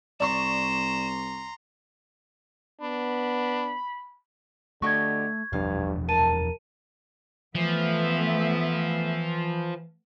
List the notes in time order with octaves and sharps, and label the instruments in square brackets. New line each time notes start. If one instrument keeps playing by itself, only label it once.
[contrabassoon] C2 [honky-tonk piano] D5 C#6 [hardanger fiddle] A#5 C6 [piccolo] E7
[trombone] B3 [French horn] D4 [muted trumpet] B5
[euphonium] D3 [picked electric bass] A3 [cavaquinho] F#4 G4 D#5 [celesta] C#6 G#6
[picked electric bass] E1 F3 D4 [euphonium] G2 [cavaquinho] F5
[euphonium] A#4 [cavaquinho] A5 [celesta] D#7
[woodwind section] E3 [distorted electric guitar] F3 [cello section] A3 B3 E5